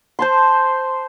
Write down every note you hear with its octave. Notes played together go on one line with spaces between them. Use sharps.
C5 A5 C6